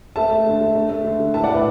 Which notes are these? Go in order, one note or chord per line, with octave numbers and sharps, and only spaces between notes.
A3 E5 A5
A3
D3
A3
A3
A3
D3
D3
A2 E5 A5
D5 F#5
A2 B4 E5